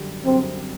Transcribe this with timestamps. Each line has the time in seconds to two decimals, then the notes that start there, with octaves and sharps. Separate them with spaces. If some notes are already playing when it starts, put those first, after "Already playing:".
Already playing: F#2 D3 G3
0.25 F#2 D3 G3 C4